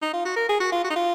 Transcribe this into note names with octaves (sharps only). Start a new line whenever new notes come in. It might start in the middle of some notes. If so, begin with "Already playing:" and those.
D#4
F4
F#4
A#4
G#4
F#4
F4
F#4
D#4
F4